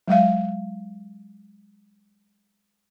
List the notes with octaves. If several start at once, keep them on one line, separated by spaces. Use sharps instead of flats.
F#3 G#3 E5 F5